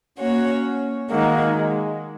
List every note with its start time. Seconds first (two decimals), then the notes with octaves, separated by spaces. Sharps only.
0.17 A#3 C#4 F#4 C#5
1.09 D#3 G#3 A#3 D#4 F#4
1.56 G#3